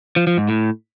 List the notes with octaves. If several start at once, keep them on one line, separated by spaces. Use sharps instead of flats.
F3
F3
G#2
A2